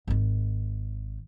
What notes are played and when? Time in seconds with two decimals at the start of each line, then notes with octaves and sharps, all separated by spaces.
0.07 G#1 D#3